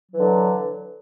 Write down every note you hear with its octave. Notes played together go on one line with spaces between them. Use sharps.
D3 E3 F#3